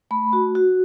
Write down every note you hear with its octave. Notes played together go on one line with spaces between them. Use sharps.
A3 B5
F#4
F#4